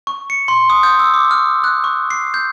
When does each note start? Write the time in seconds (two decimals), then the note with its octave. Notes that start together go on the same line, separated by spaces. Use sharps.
0.07 C#6
0.30 C#7
0.48 C6
0.70 D#6
0.83 G6
0.99 E6
1.14 D6
1.31 F6
1.64 F#6
1.84 C#6
2.11 C7
2.34 G6